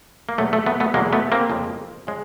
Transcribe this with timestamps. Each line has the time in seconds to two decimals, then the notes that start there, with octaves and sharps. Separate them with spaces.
0.29 A#3
0.38 E2 B2 F#3 A3
0.53 A3
0.66 A3 B3
0.80 A3 B3
0.94 E2 B2 F#3 G#3 A#3
1.13 A3 B3
1.32 A#3 C4
1.50 F2 C#3 F3 G#3
2.07 C#3 F3 G#3